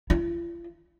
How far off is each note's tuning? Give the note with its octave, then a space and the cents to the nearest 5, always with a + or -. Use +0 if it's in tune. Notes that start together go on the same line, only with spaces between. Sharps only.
F4 -45